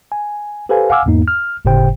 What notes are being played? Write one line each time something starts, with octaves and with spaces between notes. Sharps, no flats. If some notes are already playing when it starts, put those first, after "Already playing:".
G#5
G4 A4 B4 C5 F5 G#5
F5 F#5 G#5 D6 E6 F6
E2 G#2 A#3 D#4
F6
G1 A2 C#3 G4 C5 G5